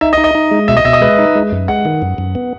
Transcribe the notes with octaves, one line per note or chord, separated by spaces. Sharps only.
D#4 E5
D#5
D#4
D#5
D#4
G#3
B2 E5
D#5
B2 E5
D#5
G#3 B4
D#4
G#3
F#2
G#3 F#5
D#3
F#2
F#2
B3